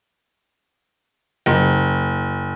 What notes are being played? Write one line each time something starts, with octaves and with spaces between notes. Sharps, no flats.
F#1